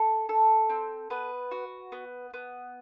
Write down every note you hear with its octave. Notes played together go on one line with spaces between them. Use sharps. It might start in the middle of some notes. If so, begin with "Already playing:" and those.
Already playing: A4
A4
C4
B3 B4
F#4
B3
B3